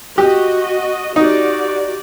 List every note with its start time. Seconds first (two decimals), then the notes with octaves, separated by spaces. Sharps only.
0.18 F#4 G4 D#5
1.16 D#4 F#4 G4 D5